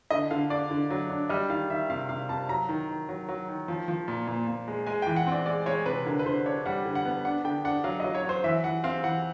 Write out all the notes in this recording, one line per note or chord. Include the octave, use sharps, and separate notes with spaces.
D3 D#5
D3 F5
D4 D5
D3
F#3
D4
G3 D#5
D#3 F5
D#3 E5
C3 F5
C3 F5
C3 A5
F#3 A#5
D#3
D#3
F#3
F#3
D#3
F3
F3
A#2
A#2
A#2
G#3
G#3 G#5
G5
E3
F#5
C4
D5
G#3 D5
G#3 C#5
C3 B4
D3 A#4
B4
D3 C5
D4 C#5
G3 F#5
D3
F#5
B3
D4 F#5
D3 G5
D4 F#5
F#3 F5
D#5
F#3
C#5
F#3 C5
E3 E5
E3 F#5
C4 F5
E3 F#5